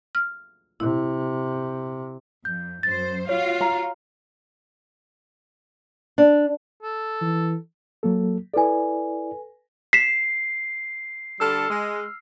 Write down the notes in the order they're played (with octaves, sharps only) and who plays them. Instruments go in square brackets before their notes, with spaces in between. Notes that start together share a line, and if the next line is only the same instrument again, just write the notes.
[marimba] F6
[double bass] C3 [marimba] E4
[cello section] F2 [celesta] G6
[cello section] F#2 C5 [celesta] A6
[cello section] F4 F#4 F5 [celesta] C#5
[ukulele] A#5
[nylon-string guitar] D4
[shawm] A4
[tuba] E3
[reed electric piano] F#3 A#3 A4
[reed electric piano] E4 D5 [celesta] A4 B4 G#5
[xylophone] B6 E7 [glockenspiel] C7
[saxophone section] D3 G3 A4 [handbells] E6 F6
[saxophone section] G#3